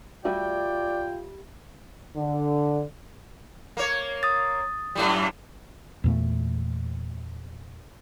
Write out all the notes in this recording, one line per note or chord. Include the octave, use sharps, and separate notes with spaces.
G3 A3 F4 F#4 D5 G5
D3
A#3 C#5
D#6 A6
F#2 A2 G3
E2 A#2 A3